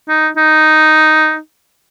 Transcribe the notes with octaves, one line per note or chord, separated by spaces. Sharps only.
D#4
D#4